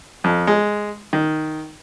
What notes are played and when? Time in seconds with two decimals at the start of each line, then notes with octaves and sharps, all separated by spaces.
0.24 F2
0.47 G#3
1.13 D#3